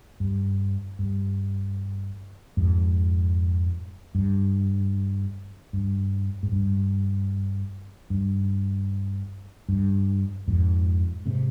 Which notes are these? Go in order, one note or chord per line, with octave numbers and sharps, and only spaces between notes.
G2
G2
F2 G#2
G2
G2
G#2
G2
G2
G2
F2 G#2
G#2 C3